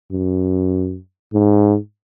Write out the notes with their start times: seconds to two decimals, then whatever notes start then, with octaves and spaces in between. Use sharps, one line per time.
0.12 F#2
1.34 G#2